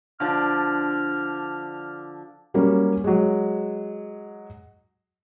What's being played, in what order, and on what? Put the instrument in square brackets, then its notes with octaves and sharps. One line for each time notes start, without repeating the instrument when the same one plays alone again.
[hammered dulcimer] D3 F3 D4 [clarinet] F6
[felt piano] F#3 G3 A#3 C#4
F#3 G#3